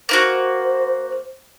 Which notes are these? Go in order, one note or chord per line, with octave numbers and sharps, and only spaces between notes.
A#3 E4 F#4 C5